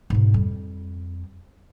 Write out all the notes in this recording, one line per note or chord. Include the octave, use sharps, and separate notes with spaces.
G#2 B2
F2 G3